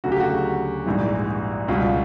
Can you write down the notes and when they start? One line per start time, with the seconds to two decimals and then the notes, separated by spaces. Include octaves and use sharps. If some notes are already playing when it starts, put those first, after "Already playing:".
0.04 D2 C#3 F#3 F#4
0.12 G4
0.20 F#4
0.86 A#1 G#2 E3 G3
1.68 C#2 B2 G3 F4